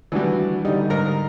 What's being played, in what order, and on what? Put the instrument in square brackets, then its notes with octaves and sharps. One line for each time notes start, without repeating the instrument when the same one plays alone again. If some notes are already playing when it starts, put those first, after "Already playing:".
[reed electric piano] D#3 D4 F#4 [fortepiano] E3 G3
[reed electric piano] D3 G3 [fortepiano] D#4
[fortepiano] G#2 A#4 A#5